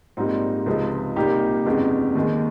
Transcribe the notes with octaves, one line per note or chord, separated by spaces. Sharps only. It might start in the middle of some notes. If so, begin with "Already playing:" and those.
A#1 G#2 G3 A#3 C4 D#4
C#2 C3 F3 G#3
C2 A#2 G3 A#3 D#4 G4
G1 F2 C#3 G#3
D#2 D#3 G#3